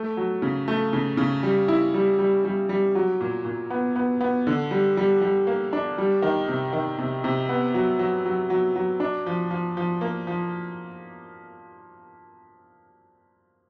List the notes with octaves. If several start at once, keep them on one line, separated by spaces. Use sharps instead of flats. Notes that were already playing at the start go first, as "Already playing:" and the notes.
Already playing: A3
F#3
C#3
A3
C#3
C#3
G3
E4
G3
G3
G3
G3
F#3
A#2
A#2
B3
B3
B3
D3
G3
G3
G3
A#3
D4
G3
D#3
C3
D#3
C3
C3
B3
F#3
F#3
F#3
F#3
F#3
D4
F3
F3
F3
A#3
F3